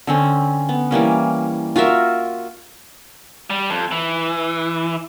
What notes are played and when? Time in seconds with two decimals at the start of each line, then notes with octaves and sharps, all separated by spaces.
0.07 D3 C4 C#4
0.69 B3
0.91 E3 G3 A#3 C#4
1.76 F4 F#4 A#4 E5
3.50 G3
3.70 F2
3.92 E3